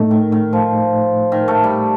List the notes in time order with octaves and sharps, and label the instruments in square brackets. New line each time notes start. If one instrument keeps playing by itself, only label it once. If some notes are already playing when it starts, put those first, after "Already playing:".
Already playing: [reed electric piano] A2 A3 D#4
[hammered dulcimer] D#3
D#3
F3
D#3
A3
G3